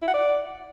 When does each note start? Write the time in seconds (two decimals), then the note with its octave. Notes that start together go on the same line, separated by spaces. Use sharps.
0.02 E4
0.08 F#5
0.14 D5